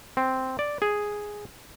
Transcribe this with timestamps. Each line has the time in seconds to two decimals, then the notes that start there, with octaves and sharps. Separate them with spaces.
0.17 C4
0.59 D5
0.82 G#4